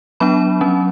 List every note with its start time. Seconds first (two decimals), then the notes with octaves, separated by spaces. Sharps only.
0.20 F#3 B3 D4 B5
0.61 F#3 C#4